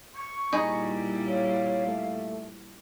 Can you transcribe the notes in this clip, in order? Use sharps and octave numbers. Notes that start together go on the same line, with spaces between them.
C#6
A#2 G3 D#4 E4 G#4 B5
C#5 F5
A3